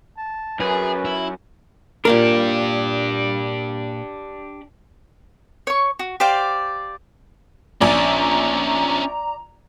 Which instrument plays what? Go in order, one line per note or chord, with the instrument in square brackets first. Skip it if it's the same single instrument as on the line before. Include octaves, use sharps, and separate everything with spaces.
[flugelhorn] A5
[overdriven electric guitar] F#2 [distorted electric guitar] G#4 [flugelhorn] B4
[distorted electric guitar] E4
[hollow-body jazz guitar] A#2 A#3 A#4 [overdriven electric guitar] D4 G4
[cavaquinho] C#5 C#6
F#4
G4 C5 D5 F5
[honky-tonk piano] A#1 G#5 [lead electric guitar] C#4 D4 [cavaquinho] D5 [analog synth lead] A#5